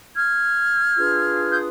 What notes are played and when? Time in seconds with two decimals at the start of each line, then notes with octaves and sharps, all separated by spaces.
0.15 F6 G#6
0.96 D4 F4 G#4 B4
1.50 D#6 G6